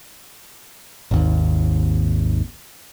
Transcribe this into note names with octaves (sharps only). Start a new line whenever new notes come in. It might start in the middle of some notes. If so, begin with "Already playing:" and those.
G#1 D#2